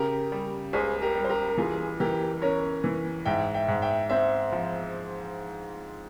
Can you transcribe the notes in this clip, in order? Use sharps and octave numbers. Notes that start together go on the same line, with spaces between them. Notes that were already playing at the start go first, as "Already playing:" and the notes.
Already playing: C#3 G4 A#4
G3
C#2 G#4 C5
G4 A#4
G3
C5
G4 A#4
A#4
E3 F4 G#4
E3 G4 A#4
C#4 A#4 C#5
E3
G#2 E5 G5
E5 G5
G#2
E5 G5
C4 C5 E5
F3